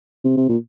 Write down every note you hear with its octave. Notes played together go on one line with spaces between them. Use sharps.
C3
C3
A#2